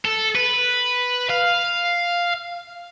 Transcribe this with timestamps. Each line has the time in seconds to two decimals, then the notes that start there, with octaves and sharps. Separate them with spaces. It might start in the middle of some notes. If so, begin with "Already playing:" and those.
0.05 A4
0.35 B4
1.29 F5